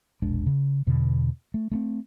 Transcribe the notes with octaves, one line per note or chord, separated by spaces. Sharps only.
E1 A#1 G#3 D4
C#3
E2 B2 D3
A3
A3 B3 C4